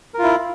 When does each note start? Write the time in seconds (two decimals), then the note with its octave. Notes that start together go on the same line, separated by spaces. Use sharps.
0.14 A#4
0.19 F4
0.23 E4